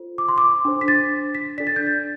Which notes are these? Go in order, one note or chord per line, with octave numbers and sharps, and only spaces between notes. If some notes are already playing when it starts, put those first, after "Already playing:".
Already playing: F4 A4 C5
D6
C6
D6
D4 A4 C5
B6
A6
B6
D4 A4 D5 B6
A6
G6
A6